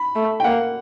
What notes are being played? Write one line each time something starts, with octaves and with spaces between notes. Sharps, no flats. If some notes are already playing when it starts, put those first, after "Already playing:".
Already playing: B5
A3
G5
A#3 F#5